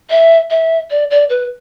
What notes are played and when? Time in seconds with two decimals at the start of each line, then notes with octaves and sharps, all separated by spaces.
0.10 E5
0.50 E5
0.90 D5
1.10 D5
1.29 B4